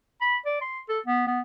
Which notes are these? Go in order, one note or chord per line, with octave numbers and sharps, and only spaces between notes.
B5
D5
C6
A4
B3
B3